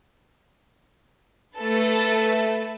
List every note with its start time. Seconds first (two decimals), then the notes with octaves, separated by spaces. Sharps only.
1.57 A3 A4 B4 A5